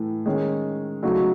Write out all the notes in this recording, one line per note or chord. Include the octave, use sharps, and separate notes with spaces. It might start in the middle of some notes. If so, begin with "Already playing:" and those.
Already playing: A2 E3 A3
D#3 G#3 C#4
C#3 F#3 A3 D#4 F#4